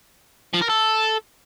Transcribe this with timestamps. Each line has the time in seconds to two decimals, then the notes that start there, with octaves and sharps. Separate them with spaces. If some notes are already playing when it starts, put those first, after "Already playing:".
0.53 F3
0.61 A#4
0.69 A4